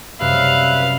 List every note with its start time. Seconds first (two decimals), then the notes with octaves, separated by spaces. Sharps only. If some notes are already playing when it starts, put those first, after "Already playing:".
0.20 F#2 C3 G3 B4 E5 F5 F#6